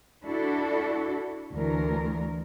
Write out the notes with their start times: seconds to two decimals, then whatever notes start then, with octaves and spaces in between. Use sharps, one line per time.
0.24 D4 E4 F#4 A4
1.53 D2 E3 A#4